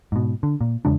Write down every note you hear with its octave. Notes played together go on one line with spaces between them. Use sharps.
G#2 B2
D3
A#2
E2 C#3 G#3 D4